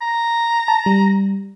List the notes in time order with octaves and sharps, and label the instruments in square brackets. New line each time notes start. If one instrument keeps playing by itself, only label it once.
[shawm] A#5
[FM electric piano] A5
G3